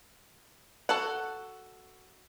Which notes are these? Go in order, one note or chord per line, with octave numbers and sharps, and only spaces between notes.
F#4 A4 F#5